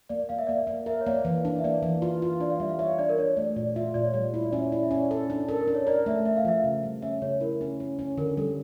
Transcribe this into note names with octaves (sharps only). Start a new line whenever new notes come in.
A#3 D5
A#3 F5
E5
A#3 D5
E5
A#3
A#4 E5
C#5
A#3 D5
E3
D4
E5
A#3 D5
E3
F4
F4
D4 D5
F5
G3 E5
F5
C#5 E5
D4 D5
A#4
D4 C#5
A3 D5
A#2 D5
F4 E5
A#2 D5
C#5
G3 D5
E4
D5
C#4 E5
E4 D5
E5
C#4 D5
A4
D4
A4 A#4
A#4
D4
C#5
A#4 D5
A3 E5
A3 E5
F5
F3 E5
C#3
G3
C#4 E5
C#3 C#5
E4 A#4
C#4
C#4
C#4
D3 A#4
G3 A4